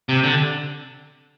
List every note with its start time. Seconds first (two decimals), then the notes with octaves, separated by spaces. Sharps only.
0.09 C3
0.24 D3